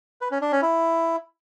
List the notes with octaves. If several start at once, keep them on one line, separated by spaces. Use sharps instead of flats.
B4
C#4
D4
C#4
E4